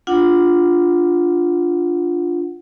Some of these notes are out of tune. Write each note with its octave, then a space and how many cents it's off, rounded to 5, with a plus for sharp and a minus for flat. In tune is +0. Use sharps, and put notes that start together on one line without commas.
D4 +0 F4 +0 F#5 +0